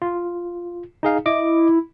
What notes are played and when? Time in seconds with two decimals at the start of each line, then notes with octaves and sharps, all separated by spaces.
0.02 F4
1.03 D#4 G#4 F5
1.26 E4 D#5 D6